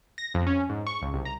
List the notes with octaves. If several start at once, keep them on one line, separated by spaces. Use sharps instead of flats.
A#6
F2
C#4
G#2
C#6
C#2
C2
A#5